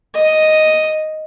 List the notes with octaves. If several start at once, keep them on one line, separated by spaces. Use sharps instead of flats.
D#5